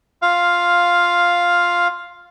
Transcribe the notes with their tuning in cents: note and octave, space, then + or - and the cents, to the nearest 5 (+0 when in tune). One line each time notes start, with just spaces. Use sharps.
F4 +5 F5 +0